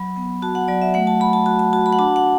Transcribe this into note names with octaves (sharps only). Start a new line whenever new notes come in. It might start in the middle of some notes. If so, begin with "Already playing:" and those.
Already playing: F#3 B5
B3
F#4 A5
F#5
F#3 D5
E5
A3 F#5
A5
A3 B5
A5
F#4 A5
A5
F#4 A5
B5
F#5
D4 A5
F#5